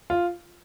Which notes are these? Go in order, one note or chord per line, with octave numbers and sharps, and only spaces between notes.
F4